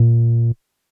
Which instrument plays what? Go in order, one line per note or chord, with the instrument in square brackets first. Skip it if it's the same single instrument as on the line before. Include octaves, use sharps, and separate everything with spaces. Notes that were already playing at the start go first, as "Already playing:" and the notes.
Already playing: [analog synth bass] A#2